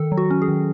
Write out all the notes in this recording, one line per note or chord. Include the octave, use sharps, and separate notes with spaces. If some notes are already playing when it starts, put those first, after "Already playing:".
Already playing: D#3 A4
F#3
F#4
C#4
G#4
D#3